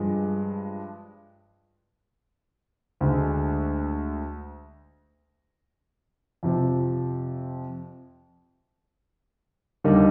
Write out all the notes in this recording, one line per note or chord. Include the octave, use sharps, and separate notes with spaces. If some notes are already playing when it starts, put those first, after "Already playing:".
Already playing: G2 F3 G#3
D2 D3 G#3
F2 C3 F3
D#2 D3 G3 A#3 D#4